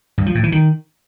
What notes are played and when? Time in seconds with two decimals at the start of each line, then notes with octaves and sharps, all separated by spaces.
0.18 G2
0.26 F3
0.35 A2
0.43 E3
0.52 D#3